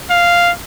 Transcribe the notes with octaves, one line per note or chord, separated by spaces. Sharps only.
F5